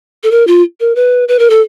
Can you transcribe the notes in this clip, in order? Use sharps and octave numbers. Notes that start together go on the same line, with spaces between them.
A4
A#4
F4
A#4
B4
B4
A#4
A4